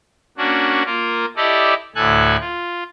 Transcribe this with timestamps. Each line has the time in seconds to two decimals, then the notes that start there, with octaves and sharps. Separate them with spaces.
0.38 A#3 C#4 D4 F#4
0.85 A#3 F4 A#4
1.37 E4 G4 A4 D5 D#5
1.95 D2 A2 A4 G#5 F#6
2.40 F4